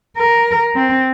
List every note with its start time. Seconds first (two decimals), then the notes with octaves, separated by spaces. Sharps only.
0.17 A#4
0.75 C4